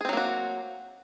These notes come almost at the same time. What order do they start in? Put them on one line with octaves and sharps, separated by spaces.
G#4 C4 F#3 A#3 F#4